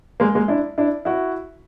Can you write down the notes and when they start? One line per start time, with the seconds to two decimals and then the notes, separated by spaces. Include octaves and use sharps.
0.20 G#3 A#3
0.35 G#3 A#3
0.48 D4 E4
0.78 D4 E4
1.05 E4 F#4